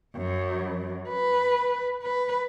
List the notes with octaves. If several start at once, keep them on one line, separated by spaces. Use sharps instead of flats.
F#2
B4
B4